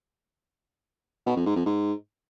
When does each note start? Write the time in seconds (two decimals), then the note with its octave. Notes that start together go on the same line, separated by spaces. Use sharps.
1.26 B2
1.36 F2
1.46 G#2
1.56 F2
1.66 G#2